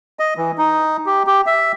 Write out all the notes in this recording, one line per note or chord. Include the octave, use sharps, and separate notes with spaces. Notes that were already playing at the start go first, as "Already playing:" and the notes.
D#5
E3
D#4
G4
G4
E5